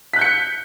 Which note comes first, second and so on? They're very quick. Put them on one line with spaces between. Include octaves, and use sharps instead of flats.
B6 F#6 G6 C#7